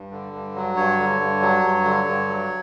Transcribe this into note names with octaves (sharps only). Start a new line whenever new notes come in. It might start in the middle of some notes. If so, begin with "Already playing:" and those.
Already playing: G2
D3
G2
F#3
G2 C#5
D3
G2
F#3
G2
D3
G2
F#3